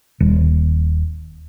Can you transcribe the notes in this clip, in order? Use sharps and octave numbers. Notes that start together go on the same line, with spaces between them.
D#1